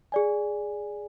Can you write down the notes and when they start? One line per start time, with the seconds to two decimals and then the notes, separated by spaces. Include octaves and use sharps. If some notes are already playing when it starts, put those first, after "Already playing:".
0.12 G#4 D5 G#5